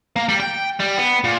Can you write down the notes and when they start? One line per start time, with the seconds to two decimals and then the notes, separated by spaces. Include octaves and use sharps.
0.16 A#3
0.29 G3
0.40 G5
0.80 G3
0.99 B3
1.24 A#2